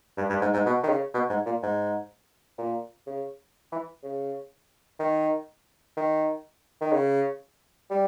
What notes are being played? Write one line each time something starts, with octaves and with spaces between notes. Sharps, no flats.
G2
G2
G#2
G#2
B2
D#3
C#3
B2
G#2
A#2
G#2
A#2
C#3
E3
C#3
D#3
D#3
D#3
C#3
G3